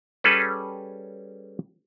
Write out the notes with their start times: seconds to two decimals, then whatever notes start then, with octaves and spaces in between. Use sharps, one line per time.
0.24 G3 C#4 G#4 A4 B4